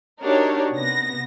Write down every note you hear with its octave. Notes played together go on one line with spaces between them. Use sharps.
D4 D#4 F#4 G4 A#4 C#5
C3 B3 A#6